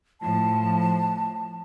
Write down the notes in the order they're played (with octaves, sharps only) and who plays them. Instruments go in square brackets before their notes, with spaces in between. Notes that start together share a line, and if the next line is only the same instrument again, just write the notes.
[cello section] A2 F3 [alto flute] A5